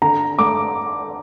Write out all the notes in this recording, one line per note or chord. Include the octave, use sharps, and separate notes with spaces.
D3 A#5
A3 D6